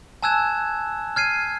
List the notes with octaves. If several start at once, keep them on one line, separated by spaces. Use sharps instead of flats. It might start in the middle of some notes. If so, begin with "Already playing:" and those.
G#5 A5 E6 F#6 G#6 E7
F6 G#6 C7 D#7